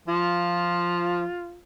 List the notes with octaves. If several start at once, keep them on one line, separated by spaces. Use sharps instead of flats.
F3 F4